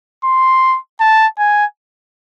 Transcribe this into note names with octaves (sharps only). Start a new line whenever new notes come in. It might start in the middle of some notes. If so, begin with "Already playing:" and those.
C6
A5
G#5